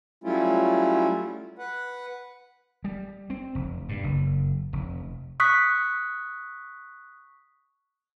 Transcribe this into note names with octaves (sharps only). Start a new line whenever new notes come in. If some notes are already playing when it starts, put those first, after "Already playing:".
F#3 G3 A3 C#4 E4 F4
B4 F#5
G3
C4
F1
G2
F#1
F1
C#6 D#6 F#6 B6